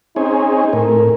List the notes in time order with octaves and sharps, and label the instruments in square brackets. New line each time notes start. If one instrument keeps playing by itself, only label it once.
[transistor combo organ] C4 C#4 G#4 [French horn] D#4
[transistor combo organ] A2 [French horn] A#4